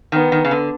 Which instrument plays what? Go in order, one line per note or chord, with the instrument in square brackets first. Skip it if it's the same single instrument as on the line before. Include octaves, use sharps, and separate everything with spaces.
[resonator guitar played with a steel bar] D#3 [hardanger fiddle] B3
[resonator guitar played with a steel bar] D#3
C#3
D3